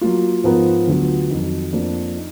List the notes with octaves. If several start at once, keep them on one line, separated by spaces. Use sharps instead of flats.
F#3 A#3 F4
G#2 F3 B3 F4 A#4
D2 D3 F#3 B3 F4
F2 D#3 F#3
F2 F3 A#3 D4
D#4